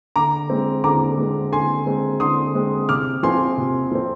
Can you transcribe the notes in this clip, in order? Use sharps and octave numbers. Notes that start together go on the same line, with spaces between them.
D3 A#5 D6
G#3 C4
D3 A#5 D6
G#3 C4
D3 G#5 C6
G#3 C4
D3 C6 D#6
G#3 C4
C3 D6 F6
F3 C4 G#5 C6
C3
F3 C4